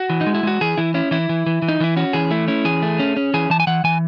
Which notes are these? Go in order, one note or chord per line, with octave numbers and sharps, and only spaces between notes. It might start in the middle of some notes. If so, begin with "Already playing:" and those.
Already playing: F#4
E3
D#4
G#3
E4
G#3 F#4
E3 G#4
E3 E4
C#4 E4
E3 E4
E3
E3
E3
D#4
E3 E4
C#4 F#4
E3 G#4
A3 E4
C#4 E4
E3 G#4
A3
C#4
C#4
E3 G#4
E3 A5
G#5
E3 F#5
E3 G#5